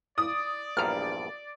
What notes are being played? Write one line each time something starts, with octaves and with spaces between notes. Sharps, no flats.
D5 D#6
A#1 E2 G2 A#5 F6